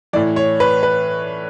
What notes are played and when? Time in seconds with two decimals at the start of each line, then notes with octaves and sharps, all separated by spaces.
0.13 E3 D5
0.16 A2
0.36 C#5
0.60 B4
0.83 B4